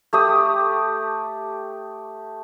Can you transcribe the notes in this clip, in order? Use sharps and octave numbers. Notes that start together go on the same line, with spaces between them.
A3 G4 D#6